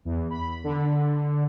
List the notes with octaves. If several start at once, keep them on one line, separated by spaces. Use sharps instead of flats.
E2
B5
D3